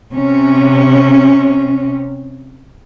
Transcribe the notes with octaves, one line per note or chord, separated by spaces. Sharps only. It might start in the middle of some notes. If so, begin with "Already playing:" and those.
C3 C#4